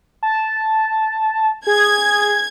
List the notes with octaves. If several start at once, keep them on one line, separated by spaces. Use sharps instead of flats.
A5
G#4 G#6